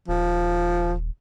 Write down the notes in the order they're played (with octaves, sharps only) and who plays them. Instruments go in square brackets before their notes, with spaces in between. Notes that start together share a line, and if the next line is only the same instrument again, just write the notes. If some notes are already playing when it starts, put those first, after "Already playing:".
[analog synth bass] D#1 [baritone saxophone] F3